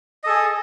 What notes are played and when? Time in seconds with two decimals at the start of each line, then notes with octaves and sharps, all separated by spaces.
0.24 D#5
0.26 A4
0.29 G#4